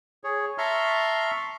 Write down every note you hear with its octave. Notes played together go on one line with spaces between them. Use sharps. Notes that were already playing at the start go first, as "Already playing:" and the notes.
G#4 C#5
E5 A5 A#5 C6 C#6 F6